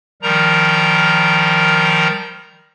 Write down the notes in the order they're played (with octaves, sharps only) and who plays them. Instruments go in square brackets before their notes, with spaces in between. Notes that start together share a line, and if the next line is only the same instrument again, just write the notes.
[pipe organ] D#3 F3 G3 A#4 A#5